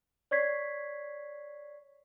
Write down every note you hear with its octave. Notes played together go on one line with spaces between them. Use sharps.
C#5 D5 C#6 G#6 B6 C7